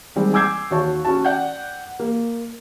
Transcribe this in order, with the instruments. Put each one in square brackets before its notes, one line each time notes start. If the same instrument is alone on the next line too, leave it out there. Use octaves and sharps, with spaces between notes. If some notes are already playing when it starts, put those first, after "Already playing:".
[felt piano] D#3 G3 G#3 C4
G#5 D6 E6 G6 G#6 C7
D#2 F#4 C#5 A5
C#4 F#4 A5
D5 F#5 G5 G6
A#3